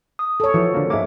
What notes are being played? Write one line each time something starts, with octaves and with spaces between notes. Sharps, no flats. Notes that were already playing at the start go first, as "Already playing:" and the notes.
D#6
A4 C#5
E3 F3 F#4
D3 A#3
G#2 G#3 A#3 E5 D6